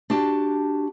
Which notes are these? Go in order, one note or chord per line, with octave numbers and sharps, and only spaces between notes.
D4 F#4 G4 A5